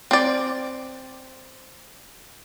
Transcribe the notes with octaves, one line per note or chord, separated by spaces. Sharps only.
C4 D5